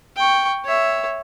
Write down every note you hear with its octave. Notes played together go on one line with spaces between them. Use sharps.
G5 C#6
C#5 E5